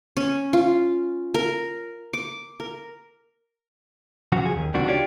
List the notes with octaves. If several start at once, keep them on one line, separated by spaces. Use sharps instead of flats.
C#4
F4
A#4
D6
A#4
C#3 F3 F#3 F#4
F2 G#4
D#2
C#2 C3 D#3 F#3 D4 F#4
D4 F4 G4 C#5 D5